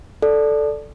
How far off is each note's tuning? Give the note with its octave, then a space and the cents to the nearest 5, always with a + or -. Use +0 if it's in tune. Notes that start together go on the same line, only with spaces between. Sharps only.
A4 +0 D5 +0